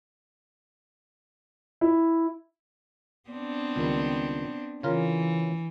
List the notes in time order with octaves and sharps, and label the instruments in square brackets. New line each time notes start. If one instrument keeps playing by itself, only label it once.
[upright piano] E4
[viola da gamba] B3 C4 D4
[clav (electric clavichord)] C#2 D#3 G3
[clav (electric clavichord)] C#3 F4 A#4 [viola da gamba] E3